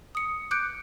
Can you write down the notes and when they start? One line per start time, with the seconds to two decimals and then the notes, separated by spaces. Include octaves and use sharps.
0.15 D#6 C#7
0.51 D6 F#6 G6 C#7 D7